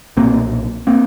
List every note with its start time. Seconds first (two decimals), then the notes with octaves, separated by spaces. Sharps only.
0.17 B1 A#2 A#3 C4
0.87 A#3 C4